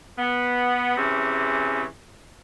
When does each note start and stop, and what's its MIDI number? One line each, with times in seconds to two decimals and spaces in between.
0.19 0.94 59
0.97 1.85 48
0.97 1.85 52
0.97 1.85 61
0.97 1.85 68